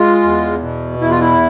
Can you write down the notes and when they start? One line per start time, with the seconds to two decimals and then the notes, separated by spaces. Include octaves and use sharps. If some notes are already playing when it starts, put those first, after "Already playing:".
Already playing: G#3 F4
0.23 E2
0.62 B2
1.01 E2 E4
1.11 F4
1.20 E4